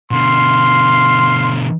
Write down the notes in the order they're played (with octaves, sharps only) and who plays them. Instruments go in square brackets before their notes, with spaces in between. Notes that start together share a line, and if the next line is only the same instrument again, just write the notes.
[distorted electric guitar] B2 D3 [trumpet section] F5 C6